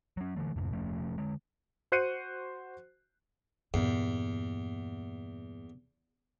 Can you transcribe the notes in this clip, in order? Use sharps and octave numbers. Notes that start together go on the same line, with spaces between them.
F#3 C#4
D3 E3 A3
F2 G#2 C3
F1 F3 A3 C#4
D3 G#3
F#4 C5 F#6 C7 C#7 D#7
E2 G2 A#2